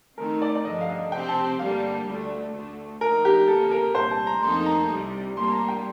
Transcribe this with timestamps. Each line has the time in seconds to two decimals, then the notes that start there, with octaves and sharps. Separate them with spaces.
0.18 D#3 A3 C4 D#4 A#4
0.42 D5
0.55 D5
0.65 G2 D3 F3 D#5
0.81 F5
0.89 D#5
1.12 C3 F3 C4 G4 C5 G5
1.29 A5
1.59 G2 D3 G3 A#3 F5
2.07 D2 D3 A3
2.54 D2 D3 A3
3.01 F3 A#3 D#4 A#4
3.25 G4
3.48 D2 C3 F3 A#3 A4
3.71 A#4
3.95 C2 A#2 G3 C5
4.11 A5
4.27 A#5
4.42 F2 D#3 A#3 D#4 A4 C6
4.66 A#5
4.90 C2 C3 G3
5.37 A#2 G3 A#3 D4 C6
5.52 A#5
5.68 G5